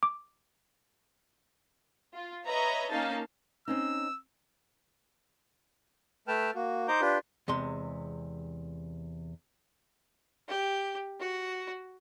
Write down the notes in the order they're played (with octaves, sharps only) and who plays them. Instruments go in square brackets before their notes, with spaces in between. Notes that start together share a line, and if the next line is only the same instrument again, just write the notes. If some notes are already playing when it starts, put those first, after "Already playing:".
[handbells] D6
[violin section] F4
B4 C#5 D#5 E5 A#5
A#3 C#4 D#4 F5 A5
[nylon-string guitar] C4 C#4 D#4 [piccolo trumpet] E6
[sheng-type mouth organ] A3 B4 G5 A5 F6
A#3 F#4
D#4 C5 A#5 D6 G6
D4 F4 G4 B4
[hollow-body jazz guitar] E2 C3 G#3 C6
[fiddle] G4
F#4